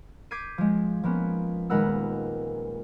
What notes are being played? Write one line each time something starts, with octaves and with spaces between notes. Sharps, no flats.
D6 G6 G#6 B6 C7 D#7
F3 G#3
F3 A#3 B3 C#4
D#1 G#3 A#4 B4 F#5 E6